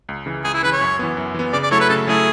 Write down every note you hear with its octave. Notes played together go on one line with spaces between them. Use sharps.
C#2
C#3 E3
C#2 G#4
E4
C#3 E3 B4
C#5
F#2
E3 B3
F#2
E3 B3
C#3 D5
D5
F#3 A3 E4 A4 C#5
B4
C#3 A4
F#3 A3 E4 G#4 A4